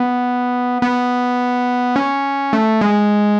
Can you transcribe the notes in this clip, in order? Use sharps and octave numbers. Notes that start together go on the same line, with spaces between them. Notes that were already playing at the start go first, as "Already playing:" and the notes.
Already playing: B3
B3
C#4
A3
G#3